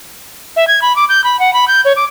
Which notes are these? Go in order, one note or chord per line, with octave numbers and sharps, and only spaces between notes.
E5
G#6
B5
D6
G6
B5
F#5
B5
G6
C#5
D6